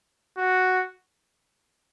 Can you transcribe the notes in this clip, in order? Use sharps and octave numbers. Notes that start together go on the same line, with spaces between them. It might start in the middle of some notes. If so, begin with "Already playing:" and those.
F#4